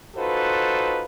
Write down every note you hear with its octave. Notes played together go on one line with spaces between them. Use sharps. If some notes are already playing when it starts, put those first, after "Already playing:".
D#4 F4 F#4 A4 B4 C5